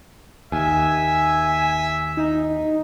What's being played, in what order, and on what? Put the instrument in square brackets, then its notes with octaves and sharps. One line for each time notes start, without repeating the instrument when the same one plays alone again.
[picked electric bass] D#2 [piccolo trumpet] E5 [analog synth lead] G#5
[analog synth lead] D#4